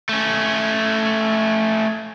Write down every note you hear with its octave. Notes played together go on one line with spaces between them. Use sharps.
A3 C#4